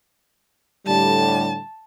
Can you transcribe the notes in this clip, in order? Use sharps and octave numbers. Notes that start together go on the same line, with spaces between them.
A2 D3 G3 A5